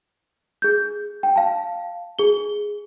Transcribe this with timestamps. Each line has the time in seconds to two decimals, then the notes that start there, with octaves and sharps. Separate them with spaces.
0.62 G#4 G6
1.23 G5
1.36 F5 A5
2.19 G#4 G7